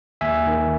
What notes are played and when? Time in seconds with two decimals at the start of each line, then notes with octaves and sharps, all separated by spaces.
0.21 D#2 E5 G#5
0.47 D#3